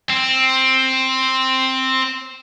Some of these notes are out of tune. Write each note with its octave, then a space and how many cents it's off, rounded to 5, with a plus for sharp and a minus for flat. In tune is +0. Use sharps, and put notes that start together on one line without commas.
C4 +5